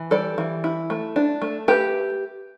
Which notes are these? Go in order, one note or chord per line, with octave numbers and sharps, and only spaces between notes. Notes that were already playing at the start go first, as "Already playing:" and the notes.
Already playing: E3
G3 A4 D5
E3
E4
A3
D4
A3
A3 G4 B4